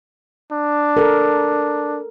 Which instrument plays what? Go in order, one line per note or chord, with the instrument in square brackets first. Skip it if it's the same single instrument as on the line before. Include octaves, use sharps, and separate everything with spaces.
[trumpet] D4
[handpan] A4 A#4